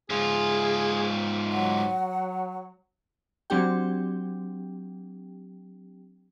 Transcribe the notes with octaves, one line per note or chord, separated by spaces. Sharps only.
G#2 F4 G#4
F#3 F#5
F#3 C4 D4 G4 G5